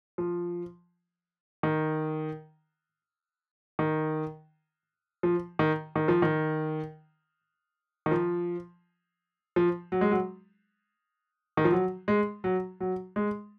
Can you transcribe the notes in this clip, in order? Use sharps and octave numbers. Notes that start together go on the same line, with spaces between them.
F3
D#3
D#3
F3
D#3
D#3
F3
D#3
D#3
F3
F3
F#3
G#3
F#3
D#3
F3
F#3
G#3
F#3
F#3
G#3